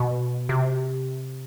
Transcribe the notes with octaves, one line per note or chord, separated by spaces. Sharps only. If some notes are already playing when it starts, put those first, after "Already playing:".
Already playing: B2
C3